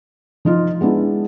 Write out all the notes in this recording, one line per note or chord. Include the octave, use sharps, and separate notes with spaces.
F3 D#4 F4
G#3 B3 D4 E4